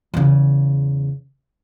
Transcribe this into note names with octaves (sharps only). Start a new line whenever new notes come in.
E2 C#3